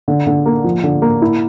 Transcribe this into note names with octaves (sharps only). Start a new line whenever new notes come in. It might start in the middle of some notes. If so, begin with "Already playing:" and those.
D3
D3
A#3
F3
D3
A#3
E4